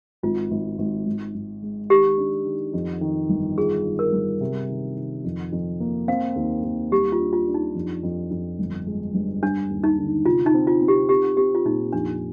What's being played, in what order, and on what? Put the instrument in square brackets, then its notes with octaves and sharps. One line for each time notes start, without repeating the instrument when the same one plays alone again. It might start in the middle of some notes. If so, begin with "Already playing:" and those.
[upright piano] G#1 [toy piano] F4
[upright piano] G#1
G#1
G#2
G#2
G#3
[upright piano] D#3 [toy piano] G4
[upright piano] D4
D#3
F2
D#3
G1
[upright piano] F4 [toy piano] G#4
[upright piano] D#3
[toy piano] A#4
[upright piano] G2
C3
D#3
D#3
F2
F2
A#3
[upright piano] C4 [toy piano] F5
[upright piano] D#2
D#2
[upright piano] G3 [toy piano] G4
[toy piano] F4
[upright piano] D4
[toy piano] F4
[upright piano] D4
[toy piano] D#4
[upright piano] F2
F2
F2
G1
G#3
G2
[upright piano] G3 [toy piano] D4
[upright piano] D#2
[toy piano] D#4
[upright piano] D3
[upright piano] C3 [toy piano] F4
[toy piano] D#4
[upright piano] C4
[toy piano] F4
[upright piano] C4
[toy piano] G4
[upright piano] C4 [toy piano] G4
[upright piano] C4 [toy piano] G4
[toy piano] F4
[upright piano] A#2 [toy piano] D#4
[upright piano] F2 [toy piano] D4